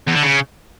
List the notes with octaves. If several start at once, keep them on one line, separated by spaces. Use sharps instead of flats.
E2
D3
C#3